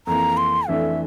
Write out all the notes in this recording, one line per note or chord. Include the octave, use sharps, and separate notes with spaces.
F2 E3 A#3 A#5
C6
F2 E3 A3 D4 E5